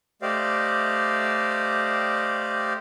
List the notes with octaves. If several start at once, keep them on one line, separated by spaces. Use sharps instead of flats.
A3 G4 C5 D5 D#5 F5